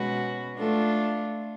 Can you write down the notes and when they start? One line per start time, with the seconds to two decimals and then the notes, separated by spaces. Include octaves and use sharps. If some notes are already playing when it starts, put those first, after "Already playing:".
Already playing: B2 G#3 C#4 F#4 B4
0.57 A3 D4 F4 A4